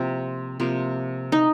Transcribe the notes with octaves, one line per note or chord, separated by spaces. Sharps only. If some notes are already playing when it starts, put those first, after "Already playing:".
Already playing: C3 F3 A#3 C4
C3 F3 A#3
D#4